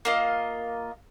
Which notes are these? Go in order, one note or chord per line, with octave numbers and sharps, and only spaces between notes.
A#3 F4 D#5